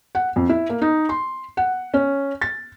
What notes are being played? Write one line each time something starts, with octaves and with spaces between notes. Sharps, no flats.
F#5
F2
E4
A#3
D#4
C6
F#5
C#4
A6